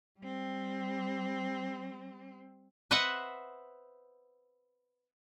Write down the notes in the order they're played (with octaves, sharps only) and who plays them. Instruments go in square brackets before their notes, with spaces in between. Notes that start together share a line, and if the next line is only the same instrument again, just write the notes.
[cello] G3 C4
[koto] B4 C5 D#5 E5 F#5